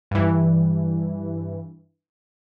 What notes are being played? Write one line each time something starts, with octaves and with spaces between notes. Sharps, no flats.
G2 E3